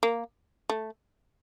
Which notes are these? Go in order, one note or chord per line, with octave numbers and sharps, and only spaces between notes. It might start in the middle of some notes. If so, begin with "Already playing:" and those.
A#3
A3